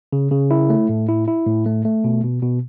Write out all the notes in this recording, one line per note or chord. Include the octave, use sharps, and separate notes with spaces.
C#3
C#3
E4
A3
A2
E4
E4
A2
A3
A3
B2
B2
B2